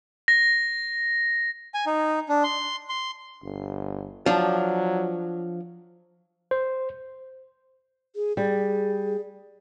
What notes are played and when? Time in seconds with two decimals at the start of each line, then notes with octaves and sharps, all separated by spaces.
0.28 A#6
1.74 G#5
1.86 D#4
2.29 D4
2.44 C6
2.89 C6
3.43 G1
4.26 F3 F#3 D4
6.51 C5
8.16 G#4
8.37 G3 G#4